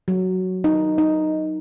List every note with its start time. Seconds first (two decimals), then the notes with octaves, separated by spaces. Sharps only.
0.08 F#3
0.64 D#4
0.98 D#4